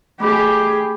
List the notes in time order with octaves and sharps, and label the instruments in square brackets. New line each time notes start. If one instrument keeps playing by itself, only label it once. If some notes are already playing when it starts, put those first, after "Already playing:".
[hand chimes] A3 B5 D6 [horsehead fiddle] G4 G#4